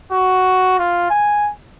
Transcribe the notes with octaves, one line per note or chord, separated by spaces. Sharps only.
F#4
F4
G#5